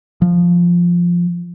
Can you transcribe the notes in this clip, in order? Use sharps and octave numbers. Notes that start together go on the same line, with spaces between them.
F3